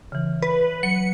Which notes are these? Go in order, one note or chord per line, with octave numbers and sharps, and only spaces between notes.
C#3 E3
B4
F#3 C#7